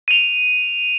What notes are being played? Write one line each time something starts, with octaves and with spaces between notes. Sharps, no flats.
D#7 F7